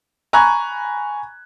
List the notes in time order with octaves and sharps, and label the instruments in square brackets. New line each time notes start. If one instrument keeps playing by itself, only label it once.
[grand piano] G#5 A#5 B5 C#6 F#6 G#6